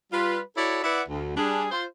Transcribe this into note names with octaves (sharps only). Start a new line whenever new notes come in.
G3 F4 B4
E4 F#4 A4 C#5 D5 E5
E4 B4 D5 E5 F#5
D2
G3 D4 G#4
F4 C5